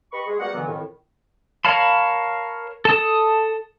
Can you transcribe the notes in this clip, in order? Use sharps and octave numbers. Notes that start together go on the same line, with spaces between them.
G4 B4 D#5 B5 C#6
G#3 G#4
G3 B3 F#4 G4 A#4 F#5
G2 B2 D3 E3 F#3 B3
F2 A2 D#3
A#4 C#5 F5 A5 B5
A4 A5 D#6